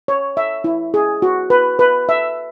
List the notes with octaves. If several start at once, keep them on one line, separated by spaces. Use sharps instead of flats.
C#5
E5
E4
G#4
F#4
B4
B4
E5